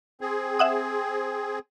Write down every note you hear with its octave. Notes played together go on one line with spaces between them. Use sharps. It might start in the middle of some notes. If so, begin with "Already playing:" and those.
C4 G#4
E5 F#5 D#6